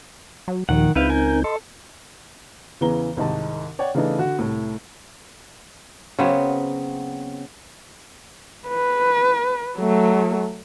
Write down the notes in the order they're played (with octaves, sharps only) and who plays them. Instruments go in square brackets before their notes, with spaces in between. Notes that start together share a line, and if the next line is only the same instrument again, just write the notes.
[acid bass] F#3
[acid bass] D#2 [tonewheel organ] A#2 F3 [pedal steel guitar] D#3 F#5
[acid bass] C#2 [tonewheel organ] C4 D#4 G6 [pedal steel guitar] E4 B4 F5
[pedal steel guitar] A#4 G#5
[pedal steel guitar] A4 [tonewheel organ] D#5 C6
[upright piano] E2 C#3 E3 B3 A#5 G7
C2 G#2 D#3 D#4 A5
C#5 D5 F#5 G5
C#3 E3 A3 B3 D4 D#4
D3 F#4
C2 A2
[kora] C#3 F#3 B3 C4
[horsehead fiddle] B4
F#3 A3